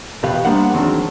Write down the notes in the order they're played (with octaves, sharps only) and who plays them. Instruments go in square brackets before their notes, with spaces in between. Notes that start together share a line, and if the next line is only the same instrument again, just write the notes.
[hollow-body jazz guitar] E2 B2 B3 G4 B4 F5
G3 A#3 B3 D4 C5 F#5
E2 D#3 F#3 G#3 C4 D4